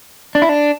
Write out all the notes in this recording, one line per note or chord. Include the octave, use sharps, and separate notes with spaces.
D4
E4
D4